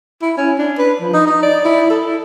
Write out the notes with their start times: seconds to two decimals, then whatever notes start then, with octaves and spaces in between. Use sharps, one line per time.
0.22 E4
0.38 C#4
0.59 D4
0.78 B4
1.01 F3
1.14 D#4
1.27 D#4
1.43 D5
1.65 E4
1.90 A4
2.06 E4